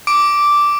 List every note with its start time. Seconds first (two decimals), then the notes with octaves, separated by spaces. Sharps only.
0.07 D6 D7